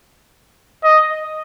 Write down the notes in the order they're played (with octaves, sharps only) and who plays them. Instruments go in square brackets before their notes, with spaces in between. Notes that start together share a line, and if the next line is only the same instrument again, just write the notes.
[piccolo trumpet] D#5